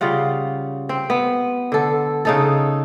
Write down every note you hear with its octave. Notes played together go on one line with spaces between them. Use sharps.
C#3 G3 F4 F#5
C4
B3
D3 A4
C#3 D#4 A4